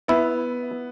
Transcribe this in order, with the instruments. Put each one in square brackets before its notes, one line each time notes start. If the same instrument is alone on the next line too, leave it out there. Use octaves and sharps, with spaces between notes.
[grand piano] B3 [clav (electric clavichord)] E4